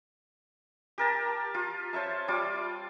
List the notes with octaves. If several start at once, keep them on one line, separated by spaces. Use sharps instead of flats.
G4 A#4 A5
F4
C5 C#5 E5 A5
G3 F4 D6